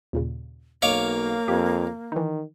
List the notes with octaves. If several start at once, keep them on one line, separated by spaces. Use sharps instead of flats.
D#2 A#2 C#3
B1 A#3 C#5 D#5 F5 D6
F2 G4
D#3 E3 D#4